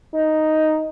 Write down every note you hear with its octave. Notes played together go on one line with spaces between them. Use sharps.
D#4